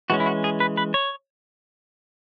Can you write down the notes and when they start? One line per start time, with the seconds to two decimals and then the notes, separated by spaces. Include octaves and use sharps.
0.10 E3 G#3 C#4 F#4
0.20 E4
0.26 F#4
0.44 G#4
0.60 B4
0.77 B4
0.94 C#5